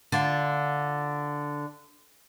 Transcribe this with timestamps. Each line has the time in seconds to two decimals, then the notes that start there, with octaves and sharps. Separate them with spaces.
0.12 D3 F4